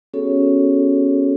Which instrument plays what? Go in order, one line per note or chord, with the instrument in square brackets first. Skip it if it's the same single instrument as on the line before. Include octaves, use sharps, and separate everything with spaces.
[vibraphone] B3 C#4 F#4 G#4 A4 C#5